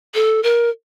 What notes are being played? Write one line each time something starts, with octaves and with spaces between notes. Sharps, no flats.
A4
A#4